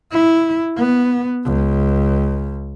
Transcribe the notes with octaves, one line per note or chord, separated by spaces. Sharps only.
E4
B3
C#2